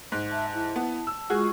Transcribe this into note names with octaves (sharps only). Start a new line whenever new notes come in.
G#2
E5 A5
E4
B3
E6
G#3 F4 F#4 G#4 C#6